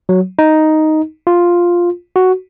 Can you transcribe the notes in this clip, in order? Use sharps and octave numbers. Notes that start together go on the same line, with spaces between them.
F#3
D#4
F4
F#4